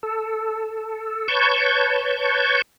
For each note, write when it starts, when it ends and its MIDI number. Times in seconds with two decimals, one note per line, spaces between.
0.03 1.28 69
1.28 2.62 71
1.28 2.62 73
1.28 2.62 81
1.28 2.62 85
1.28 2.62 91